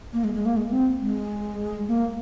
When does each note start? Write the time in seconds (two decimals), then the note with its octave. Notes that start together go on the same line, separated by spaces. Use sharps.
0.13 A#3
0.24 G#3
0.35 G#3
0.46 A#3
0.57 G#3
0.71 C4
1.00 G#3
1.88 A#3